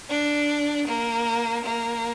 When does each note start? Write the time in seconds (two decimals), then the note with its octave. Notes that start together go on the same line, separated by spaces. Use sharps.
0.09 D4
0.87 A#3
1.64 A#3